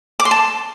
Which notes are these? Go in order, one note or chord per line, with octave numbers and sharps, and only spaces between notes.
D6
C6
A5